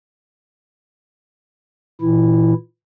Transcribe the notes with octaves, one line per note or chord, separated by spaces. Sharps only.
A#2 E3 E4